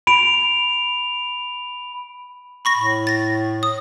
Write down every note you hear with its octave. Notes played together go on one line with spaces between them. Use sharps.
B5 D7 F7
B5 C#6 A#6
A2
A6 A#6
D#6